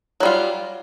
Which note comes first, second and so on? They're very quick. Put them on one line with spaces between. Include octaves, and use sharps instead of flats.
F#3 G3 F4